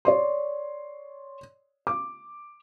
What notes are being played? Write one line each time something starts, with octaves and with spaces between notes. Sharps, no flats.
C#5 D5 C6
D6